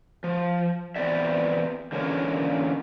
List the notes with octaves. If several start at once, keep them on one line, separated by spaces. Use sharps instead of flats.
F3
E3 B3 C4 D5 E5
D3 E3 A#3 C#4 A#4 C#5